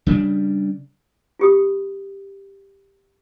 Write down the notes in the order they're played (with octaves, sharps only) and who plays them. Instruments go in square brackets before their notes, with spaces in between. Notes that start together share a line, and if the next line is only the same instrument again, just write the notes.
[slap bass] C#3 G3 A3 D4
[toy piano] F4 G4 D#6